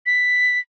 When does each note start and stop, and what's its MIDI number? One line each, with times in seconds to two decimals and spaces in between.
0.06 0.59 95